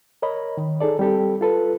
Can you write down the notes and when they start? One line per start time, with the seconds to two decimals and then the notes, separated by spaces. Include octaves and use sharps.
0.22 A#4 C#5 D#5 B5
0.57 D#3
0.81 D#4 G#4 A4 D5
0.99 G3 C4 G4 A4
1.41 F4 A4 B4